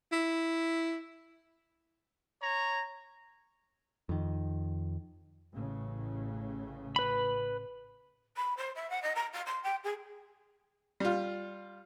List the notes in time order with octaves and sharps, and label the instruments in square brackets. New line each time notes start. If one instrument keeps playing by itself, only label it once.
[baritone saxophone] E4
[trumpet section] C#5 A#5
[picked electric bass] F2 D#3
[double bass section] A1 A2 C#3
[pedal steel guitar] B4 B5
[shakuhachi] B5
C5
E5
F#5
D#5
A#5
F5
C6
G5
G#4
[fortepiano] G3 F4